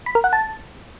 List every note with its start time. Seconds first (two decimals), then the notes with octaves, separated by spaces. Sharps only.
0.06 B5
0.15 A#4
0.24 F#5
0.33 A5